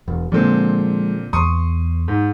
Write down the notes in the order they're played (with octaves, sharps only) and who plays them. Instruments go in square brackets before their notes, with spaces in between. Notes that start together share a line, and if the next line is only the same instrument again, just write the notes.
[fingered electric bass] E1
[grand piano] A#2 D3 C4 [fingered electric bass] F3 G3 G#3
[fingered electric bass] E2 [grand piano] C6 C#6 D#6
[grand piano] G#2